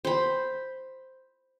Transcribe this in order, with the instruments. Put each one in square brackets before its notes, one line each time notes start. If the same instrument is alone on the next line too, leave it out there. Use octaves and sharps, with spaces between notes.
[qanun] C5 B5